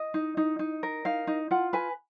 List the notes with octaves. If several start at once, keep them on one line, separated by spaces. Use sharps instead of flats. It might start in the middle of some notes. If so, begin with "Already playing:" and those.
Already playing: D#5
D#4
D#4
D#4
A#4
D#4 F5
D#4
F4 F#5
B4 G#5